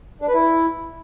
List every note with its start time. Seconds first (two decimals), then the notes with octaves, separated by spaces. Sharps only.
0.22 D4
0.28 B4
0.34 E4